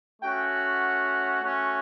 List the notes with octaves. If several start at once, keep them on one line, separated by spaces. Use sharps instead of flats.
A3 C#4 F#4 G5
F#5
A3 C#4 F#4